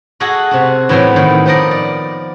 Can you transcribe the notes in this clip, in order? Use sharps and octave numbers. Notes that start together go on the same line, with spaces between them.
F#4 G#4 A4 D#5 F#5 G#5
C3 F#4
A2 E3 F#3 A3 B3 C4
A2 D#3
F3 B3 A#4 D5 D#5
D5